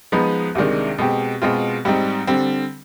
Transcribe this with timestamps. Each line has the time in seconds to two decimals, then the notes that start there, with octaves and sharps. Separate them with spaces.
0.12 F3 G#3 B3 D#4 B4
0.55 C2 C3 D#3 G#3 D4
0.98 B2 G#3 C4 G4
1.42 B2 G#3 C4 F4
1.85 G#2 G3 C4 D#4
2.27 D3 G3 C4